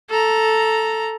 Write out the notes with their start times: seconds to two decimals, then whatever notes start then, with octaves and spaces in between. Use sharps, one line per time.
0.10 A4 A#5